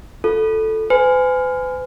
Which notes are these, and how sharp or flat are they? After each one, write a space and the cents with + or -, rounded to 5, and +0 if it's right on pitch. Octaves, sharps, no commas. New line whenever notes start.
F4 +25 A4 +0
B4 +45 G#5 +0